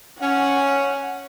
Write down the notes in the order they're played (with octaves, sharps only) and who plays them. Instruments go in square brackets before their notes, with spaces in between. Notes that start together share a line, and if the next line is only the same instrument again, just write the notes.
[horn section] C#4 [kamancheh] F#5